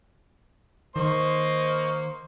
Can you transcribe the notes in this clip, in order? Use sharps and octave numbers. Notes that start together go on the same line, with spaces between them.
D#3 A#3 C5 D#5 C#6